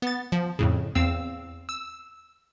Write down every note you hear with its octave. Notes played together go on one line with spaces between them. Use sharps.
B3 A6
F3
F2 A2 C#3
E2 C4 F5 E6
E6